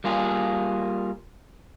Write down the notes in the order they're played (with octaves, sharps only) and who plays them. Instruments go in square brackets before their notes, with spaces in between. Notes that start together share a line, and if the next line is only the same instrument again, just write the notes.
[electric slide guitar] G3 A#3 F4 G#4